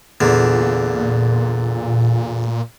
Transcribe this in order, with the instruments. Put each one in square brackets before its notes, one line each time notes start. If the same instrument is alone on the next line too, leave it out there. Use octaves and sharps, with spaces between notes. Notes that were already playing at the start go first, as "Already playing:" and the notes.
[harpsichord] E2 D3 [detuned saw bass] A#2